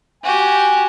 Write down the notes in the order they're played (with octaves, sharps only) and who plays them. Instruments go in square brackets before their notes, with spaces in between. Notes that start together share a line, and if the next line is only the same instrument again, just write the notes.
[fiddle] F#4 G4 [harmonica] G#5